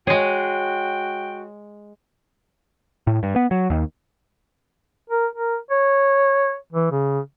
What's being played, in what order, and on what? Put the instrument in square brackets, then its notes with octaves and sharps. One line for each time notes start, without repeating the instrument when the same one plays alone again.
[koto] G#3 G#4 [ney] F#4 [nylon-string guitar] C#5 [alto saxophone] G5
[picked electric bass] A2
G2
B3
F#3
D#2
[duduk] A#4
A#4
C#5
E3
C#3